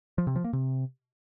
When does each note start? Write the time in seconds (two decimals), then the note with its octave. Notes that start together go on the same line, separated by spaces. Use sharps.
0.18 F3
0.27 C3
0.36 F3
0.44 A#3
0.53 C3